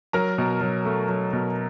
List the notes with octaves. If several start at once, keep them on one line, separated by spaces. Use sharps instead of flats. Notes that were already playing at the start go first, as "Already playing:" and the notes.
F#3 A#4 A#5
B2
F#3
A3
F#3
B2